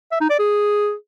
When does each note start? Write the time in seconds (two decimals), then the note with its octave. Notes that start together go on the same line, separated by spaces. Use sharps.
0.12 E5
0.21 D#4
0.30 D5
0.39 G#4